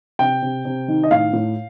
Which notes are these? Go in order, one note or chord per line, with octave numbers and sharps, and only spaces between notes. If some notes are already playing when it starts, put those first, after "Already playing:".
C3 G5
C3
C3
D#3
D#5
A2 F5
A2